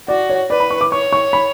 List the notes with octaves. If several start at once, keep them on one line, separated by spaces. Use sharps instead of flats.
F#4 D5
C#5
B4 D5
B5
C#6
D6
C#5 C#6
C#6
B5